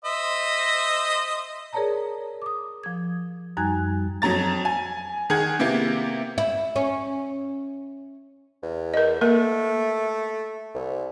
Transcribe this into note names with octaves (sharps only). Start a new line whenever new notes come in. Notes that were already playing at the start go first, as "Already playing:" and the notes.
C5 D#5 E5
G#4 A#4 C#5 D5 A5 A#5
D6 D#6
F3 G#6
F#2 G3 D#4 G#5 F#6 G#6
F2 F#3 A#5 A6
G#5
D#3 G#4 F#5 G#6
C3 A#3 B3 E4 G4
E4
C#4
E2
A#4 D#5
A3 A#3 A#4
C2